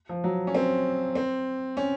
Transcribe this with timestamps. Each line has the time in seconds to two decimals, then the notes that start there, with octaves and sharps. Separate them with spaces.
0.09 F3
0.24 F#3
0.47 C#4
0.55 C4
1.15 C4
1.77 C#4